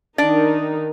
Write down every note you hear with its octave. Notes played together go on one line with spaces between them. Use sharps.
D#3 D4 D#4 D5